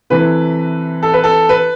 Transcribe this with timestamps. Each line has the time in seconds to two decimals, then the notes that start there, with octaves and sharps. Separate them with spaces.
0.10 C3 E3 A3 B4
1.03 A4
1.13 B4
1.24 A4
1.49 B4